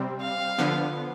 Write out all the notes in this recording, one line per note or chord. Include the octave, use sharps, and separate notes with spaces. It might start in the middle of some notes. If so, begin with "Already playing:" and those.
Already playing: C3 G3 C4
F5
D3 F3 B3